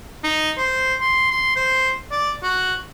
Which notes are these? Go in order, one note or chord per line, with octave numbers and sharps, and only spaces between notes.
D#4
C5
C6
C6
C5
D5
F#4